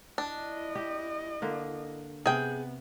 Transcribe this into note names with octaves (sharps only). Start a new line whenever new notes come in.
D4 E4 D#5
G4
D3 A#3
C3 B3 G#4 G5